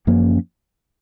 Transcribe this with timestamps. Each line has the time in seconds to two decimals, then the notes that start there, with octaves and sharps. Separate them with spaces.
0.07 F#2 F3 A#3 C#4